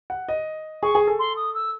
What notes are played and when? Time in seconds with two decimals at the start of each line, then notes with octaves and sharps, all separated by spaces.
0.10 F#5
0.29 D#5
0.83 G#4 C#6
0.95 G#4
1.07 A4
1.19 C6
1.36 D#6
1.54 E6